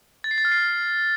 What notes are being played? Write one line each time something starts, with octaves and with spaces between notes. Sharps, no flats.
A6
C7
A6
F6
C7